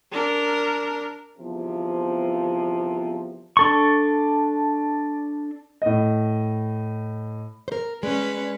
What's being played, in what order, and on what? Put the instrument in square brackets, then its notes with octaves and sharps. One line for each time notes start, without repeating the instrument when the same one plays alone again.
[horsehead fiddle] D4 A#4
[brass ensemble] G1 E2 C3 F3
[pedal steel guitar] D4 A4 C#6
[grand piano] A2 D#5
[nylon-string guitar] A#4 C5
[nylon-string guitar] G#3 [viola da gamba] C#4 B4 [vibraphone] D5